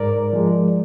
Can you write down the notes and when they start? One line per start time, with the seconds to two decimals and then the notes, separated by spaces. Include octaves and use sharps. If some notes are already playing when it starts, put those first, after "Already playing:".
Already playing: G#2 A#4 D5
0.33 F3 G#3